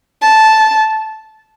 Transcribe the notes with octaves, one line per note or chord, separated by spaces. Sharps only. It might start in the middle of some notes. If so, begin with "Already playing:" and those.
A5